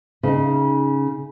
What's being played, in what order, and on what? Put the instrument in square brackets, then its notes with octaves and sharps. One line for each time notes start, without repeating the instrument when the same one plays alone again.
[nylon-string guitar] C#3 D#4